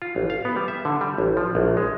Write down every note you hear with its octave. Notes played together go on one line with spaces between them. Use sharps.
F4
A1
F5
B3
G3
E5
D3
G3
A1
F3
A#1
G#3